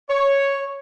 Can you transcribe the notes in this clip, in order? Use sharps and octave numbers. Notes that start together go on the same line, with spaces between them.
C#5